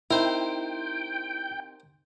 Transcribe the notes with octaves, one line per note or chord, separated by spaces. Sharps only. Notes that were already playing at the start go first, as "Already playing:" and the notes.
C4 D#4 E4 G4 A#4 C5 G5